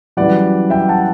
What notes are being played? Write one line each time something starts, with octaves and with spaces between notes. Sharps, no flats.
F#2 E3 G3 D5 F#5
E5 G5
F#5 A5